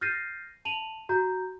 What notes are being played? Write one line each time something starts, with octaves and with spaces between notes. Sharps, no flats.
F6 G6 A6 A#6 C7 D#7
A5 D#7 F7 F#7
F#4 A#5 G6